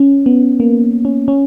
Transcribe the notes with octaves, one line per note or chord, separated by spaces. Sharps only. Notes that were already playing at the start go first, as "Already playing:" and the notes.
Already playing: C#4
B3
A#3
C#4
C#4